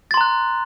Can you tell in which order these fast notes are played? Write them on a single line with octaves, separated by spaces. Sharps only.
A6 C6 A#5 F#6